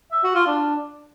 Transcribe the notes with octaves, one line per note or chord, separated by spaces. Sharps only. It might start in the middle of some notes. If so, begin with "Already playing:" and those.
E5
F#4
F4
D4